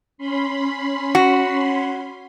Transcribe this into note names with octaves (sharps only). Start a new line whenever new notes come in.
C#4 B5 C6
F#4